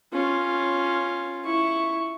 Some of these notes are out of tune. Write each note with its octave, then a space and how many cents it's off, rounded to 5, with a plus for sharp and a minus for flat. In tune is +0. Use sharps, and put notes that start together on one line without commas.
C#4 +0 F4 +0
E4 +0 C#6 +0